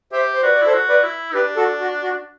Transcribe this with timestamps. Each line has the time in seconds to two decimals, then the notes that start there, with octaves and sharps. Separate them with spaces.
0.12 G4 C5 E5
0.34 C5
0.43 F#4 B4 D5
0.55 D5
0.62 E4 A4 C5
0.74 F#4
0.88 B4 D5
1.04 E4
1.34 D4 G4 B4
1.56 F#4 A4
1.80 F#4
2.02 F#4